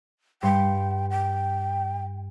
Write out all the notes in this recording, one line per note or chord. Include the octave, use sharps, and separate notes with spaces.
G2 G5 C6 C#7
G5